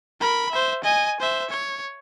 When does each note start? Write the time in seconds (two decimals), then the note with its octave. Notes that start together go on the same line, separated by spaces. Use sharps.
0.21 A#4 B5
0.51 C5 E5
0.84 D#5 G#5
1.20 C5 E5
1.50 C#5